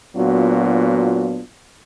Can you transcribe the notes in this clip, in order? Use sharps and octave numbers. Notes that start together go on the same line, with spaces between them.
A#2 F#3 B3 D4 F4 F#4